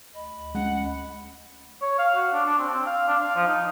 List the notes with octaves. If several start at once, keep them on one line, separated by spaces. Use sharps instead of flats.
D2 D#5 B5
G#3 C#4 F#5
C#5
F5
F#4
D4
D4
C4
C4
F5
D4
F5
F3
D#4